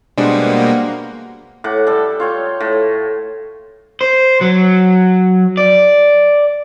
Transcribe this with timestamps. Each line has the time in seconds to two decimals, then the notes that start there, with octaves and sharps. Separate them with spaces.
0.18 B2 G3 G#3 A#3 D4 C5 F#5
1.64 A2 F#5 D6
1.87 G3 A4
2.20 F4 C#5 G5
2.60 A2
4.01 C5
4.41 F#3
5.57 D5